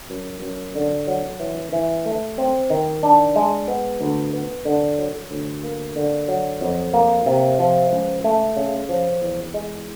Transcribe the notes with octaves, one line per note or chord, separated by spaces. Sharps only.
F#2
F#2
D3
F#3
E3
E3
A3
C4
D#3
D4
G#3
B3
D2
B3
D3
F#3
D2
A#3
D3
F#3
F2
A#3
C3
F3
C#2
A3
C#3
F3
E2
G#3